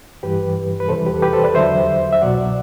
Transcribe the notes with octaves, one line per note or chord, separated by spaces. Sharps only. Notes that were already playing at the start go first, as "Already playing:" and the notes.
G2 E3 G3 G4 B4
B4
E2 C3 E3 G3 A4 C5
G4 B4
A4
G4 B4
A4 C5
B4 D5
E2 D3 F#3 C5 E5
E5
C2 B2 F#3 D5 F#5